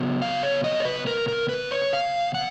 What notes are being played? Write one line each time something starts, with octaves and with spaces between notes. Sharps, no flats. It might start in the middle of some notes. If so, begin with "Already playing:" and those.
Already playing: C#3 F#3 B3
F5
C#5
D#5
C#5
B4
A#4
A#4
B4
C#5
F5
F#5